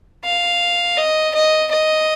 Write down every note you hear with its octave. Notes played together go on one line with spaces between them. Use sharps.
F5
D#5
D#5
D#5